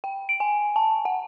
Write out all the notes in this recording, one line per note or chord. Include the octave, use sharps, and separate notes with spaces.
G5
D7
G#5
A5
F#5